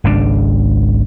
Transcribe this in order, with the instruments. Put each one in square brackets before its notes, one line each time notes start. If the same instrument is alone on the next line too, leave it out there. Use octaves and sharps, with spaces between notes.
[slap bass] G#1 C#2 D3 D4